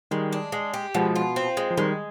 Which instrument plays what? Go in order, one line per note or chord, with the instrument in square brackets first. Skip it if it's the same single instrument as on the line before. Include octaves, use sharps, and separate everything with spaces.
[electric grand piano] D#3 G3 [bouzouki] G#3
[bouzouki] D4
G#3
G4
[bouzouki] B2 [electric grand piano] F3 G#3
[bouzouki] F4
C4
G#3
[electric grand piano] F3
[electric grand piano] D#3 G3 [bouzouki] G#3